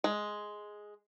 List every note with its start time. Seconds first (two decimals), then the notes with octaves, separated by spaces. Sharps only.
0.04 G#3